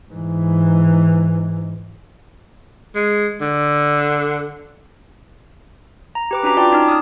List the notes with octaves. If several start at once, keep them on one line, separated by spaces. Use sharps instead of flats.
G#2 E3
G#3
D3
A#5
G4 B4 D6
C#4 D4 F#4 A#5 D6
F4 D5 G5 A5 D6
C#4 D#4 A5 F6
D#6 F6